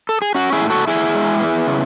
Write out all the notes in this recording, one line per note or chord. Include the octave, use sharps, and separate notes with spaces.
A4
G#4
C#4 F#4
E4 G#4
A2
F#4 A4
A2 E4 G#4
G#3
B3
C#3